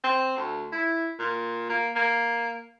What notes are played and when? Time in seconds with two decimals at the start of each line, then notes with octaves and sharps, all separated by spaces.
0.04 C4
0.37 D2
0.72 E4
1.19 A#2
1.70 A#3
1.96 A#3